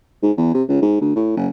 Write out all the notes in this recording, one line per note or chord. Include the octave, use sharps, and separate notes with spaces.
G#2
E2
C3
C#2
G#2
D2
A2
F#1